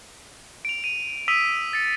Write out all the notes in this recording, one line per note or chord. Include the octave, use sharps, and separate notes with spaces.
D7 F7
D#7 F7
D#6 E6 B6 D#7 F7
A6 C#7